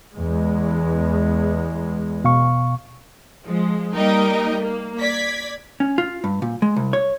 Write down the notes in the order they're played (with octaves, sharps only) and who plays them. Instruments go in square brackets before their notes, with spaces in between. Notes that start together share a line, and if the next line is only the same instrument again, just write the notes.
[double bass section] E2 G#3
[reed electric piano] B2 F5 C#6
[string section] F3 G#3
G3 A#3 D#4 A#4 D#5 G5
A#3
D5 G#6 B6
[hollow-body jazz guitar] C#4
F4
G2
A#2
G#3
C2
C#5